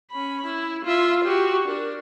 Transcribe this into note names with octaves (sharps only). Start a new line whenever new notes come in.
C#4 B5
E4
F4 E5
F#4 G4
D4 A#4